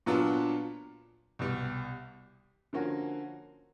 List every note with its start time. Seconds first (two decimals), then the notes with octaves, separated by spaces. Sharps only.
0.06 A#2 F#3 B3 D4 F4
1.39 C2 B2 G3
2.73 D3 F3 A#3 C#4 F#4